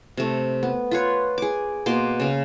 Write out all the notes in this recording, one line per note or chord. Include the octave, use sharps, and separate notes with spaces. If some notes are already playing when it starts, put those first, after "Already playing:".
C3 A3
B3
F4 B4 C#5
G#4 D6
B2 A#3 C6 D6
C#3 F5